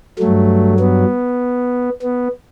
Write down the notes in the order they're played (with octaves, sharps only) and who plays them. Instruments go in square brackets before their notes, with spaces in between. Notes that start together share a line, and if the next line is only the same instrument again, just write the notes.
[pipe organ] G2 F#3 A3
B3
B3